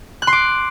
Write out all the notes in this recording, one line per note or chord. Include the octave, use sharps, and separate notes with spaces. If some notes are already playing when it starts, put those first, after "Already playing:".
F#6
C6
D6